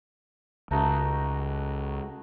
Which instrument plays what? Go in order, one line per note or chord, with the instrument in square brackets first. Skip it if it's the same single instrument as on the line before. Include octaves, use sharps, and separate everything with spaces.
[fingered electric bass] C#2 [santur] A3 D#4 F#4